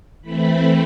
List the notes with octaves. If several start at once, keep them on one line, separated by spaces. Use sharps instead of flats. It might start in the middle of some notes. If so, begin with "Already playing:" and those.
E3 A3 C4 B5